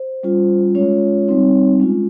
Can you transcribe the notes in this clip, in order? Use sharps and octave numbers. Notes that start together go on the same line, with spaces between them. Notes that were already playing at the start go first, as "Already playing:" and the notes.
Already playing: C5
G3 C#4 F4
G#3 C#4 F4 C#5
G3 C4 D#4
G#3 C#4 F4